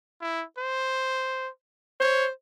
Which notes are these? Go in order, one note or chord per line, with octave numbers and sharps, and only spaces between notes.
E4
C5
C5 C#5